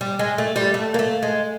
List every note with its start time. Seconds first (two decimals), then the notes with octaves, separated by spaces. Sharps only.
0.01 G3
0.19 G#3
0.38 A3
0.56 G3
0.74 A3
0.94 A#3
0.99 A3
1.23 G#3